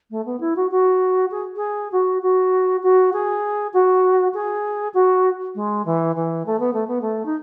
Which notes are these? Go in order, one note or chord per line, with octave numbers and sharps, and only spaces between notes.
A3
B3
E4
F#4
F#4
G#4
G#4
F#4
F#4
F#4
G#4
F#4
G#4
F#4
G#3
E3
E3
A3
B3
A3
B3
A3
D#4